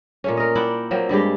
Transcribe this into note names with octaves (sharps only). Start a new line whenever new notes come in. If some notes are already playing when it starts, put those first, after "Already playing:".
A#2 A3 C#4
A#4 D#5
E4 D5 F#5 G5
F3 F#3 A#3 C4
G2 G3 G#3 G4